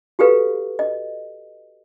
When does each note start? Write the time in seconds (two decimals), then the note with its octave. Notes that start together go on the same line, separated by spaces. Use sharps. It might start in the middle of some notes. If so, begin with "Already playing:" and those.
0.19 F#4 G4 A4 B4 F5
0.79 D#5